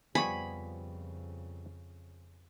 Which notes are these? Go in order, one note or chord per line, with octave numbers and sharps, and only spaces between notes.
F2 C#3 F3 G3 B3 G#5 B5 C#6